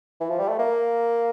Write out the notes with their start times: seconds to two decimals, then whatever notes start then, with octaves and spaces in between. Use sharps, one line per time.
0.21 E3
0.30 F3
0.39 G3
0.49 A3
0.59 A#3